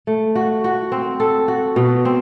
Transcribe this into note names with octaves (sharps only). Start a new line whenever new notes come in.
A3
F#4
F#4
C4
A4
F#4
B2
C4